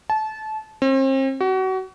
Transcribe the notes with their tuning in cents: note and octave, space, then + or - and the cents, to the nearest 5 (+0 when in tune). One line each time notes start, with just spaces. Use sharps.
A5 -25
C4 +40
F#4 +30